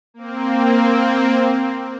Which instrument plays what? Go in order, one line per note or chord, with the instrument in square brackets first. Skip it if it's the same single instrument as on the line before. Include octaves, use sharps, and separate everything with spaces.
[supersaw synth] A#3 C4